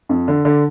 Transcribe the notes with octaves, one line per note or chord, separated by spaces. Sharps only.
F2
D3
D3